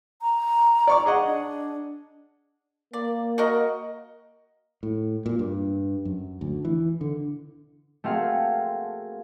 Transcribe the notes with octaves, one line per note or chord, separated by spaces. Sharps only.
A#5
D5 C#6 D6
G#4 D#5 F#5
D4
A#3 D5
F#4 A#4 D#5
A2
A#2
G2
F#2
D2
E3
D3
A3 A#3 C4 F#4 G#4 F5